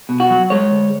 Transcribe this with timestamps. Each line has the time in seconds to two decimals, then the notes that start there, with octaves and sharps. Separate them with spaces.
0.09 B2
0.20 F#4
0.30 F#3
0.50 G#3 C#5
0.71 D2